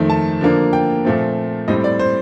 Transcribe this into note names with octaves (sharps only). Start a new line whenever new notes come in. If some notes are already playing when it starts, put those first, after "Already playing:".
Already playing: F2 D#3 A3 C4
A5
D3 F3 A#3 D4
G5
A#2 F3 A3 C4
A2 G3 C4 D#5
D5
C5